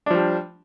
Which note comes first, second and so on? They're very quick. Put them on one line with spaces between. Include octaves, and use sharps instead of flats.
D4 F3 G3